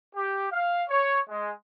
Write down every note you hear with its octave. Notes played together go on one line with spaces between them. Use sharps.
G4
F5
C#5
G#3